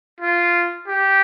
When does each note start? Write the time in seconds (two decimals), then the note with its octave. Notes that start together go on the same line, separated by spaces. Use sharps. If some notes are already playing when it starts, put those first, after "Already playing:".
0.20 F4
0.88 G4